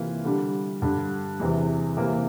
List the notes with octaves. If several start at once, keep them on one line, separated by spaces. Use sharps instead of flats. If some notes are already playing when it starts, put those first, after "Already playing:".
Already playing: C3 E3 A#3 F4
D3 G3 D4
G2 D3 G3
E2 C3 E3
C3 E3 A#3